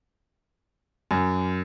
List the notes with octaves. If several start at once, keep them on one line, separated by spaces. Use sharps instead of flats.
F#2